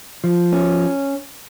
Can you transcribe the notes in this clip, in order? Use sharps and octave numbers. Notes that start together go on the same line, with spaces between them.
F3
C#4